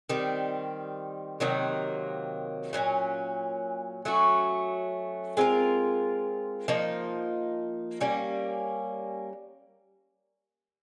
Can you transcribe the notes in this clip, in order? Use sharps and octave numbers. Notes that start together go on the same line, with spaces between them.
D#3 G3 C4
C3 D#3 F#3 A#3
A#2 F#3 A#3 C#4
F#3 A3 C#4 F#4
G#3 C4 F4 A#4
F3 A#3 D#4
G3 A#3 C#4